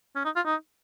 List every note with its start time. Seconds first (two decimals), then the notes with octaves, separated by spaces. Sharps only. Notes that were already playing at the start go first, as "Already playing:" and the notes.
0.16 C#4
0.25 D#4
0.36 F4
0.46 D#4